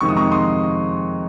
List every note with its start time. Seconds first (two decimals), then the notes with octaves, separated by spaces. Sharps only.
0.01 F2 C3 D#3 G#3 C4 C#6
0.09 D#6
0.17 A#5 C#6
0.31 C6 D#6